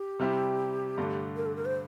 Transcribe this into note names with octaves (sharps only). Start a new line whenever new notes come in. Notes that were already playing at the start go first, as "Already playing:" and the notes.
Already playing: G4
C3 G3 C4 E4
G2 D3 A3
A#4
A4
A#4
C5